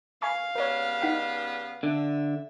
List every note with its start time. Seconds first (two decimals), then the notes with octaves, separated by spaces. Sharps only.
0.22 F5 G#5 B5 C#6
0.55 C#3 G3 B3 A#4 C#5
1.01 D#4 F#5 B6
1.83 D3 E5